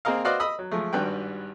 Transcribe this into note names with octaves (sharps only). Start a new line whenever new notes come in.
A#3 C4 G#4 A#4 D#5 F5
F#4 B4 C5 D5 D#5 F5
D#5 B5 D#6 E6
F#3
F3 G#3 A3
G#1 G2 G3 F#4 B4 G5